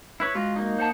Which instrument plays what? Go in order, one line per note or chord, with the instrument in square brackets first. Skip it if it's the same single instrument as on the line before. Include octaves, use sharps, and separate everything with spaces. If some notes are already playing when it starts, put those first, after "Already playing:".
[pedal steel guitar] E4 B4 C#5
[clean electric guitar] G#3 F#4 [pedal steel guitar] F4
[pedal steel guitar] A#3 D#4
[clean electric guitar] C5 F#5 A5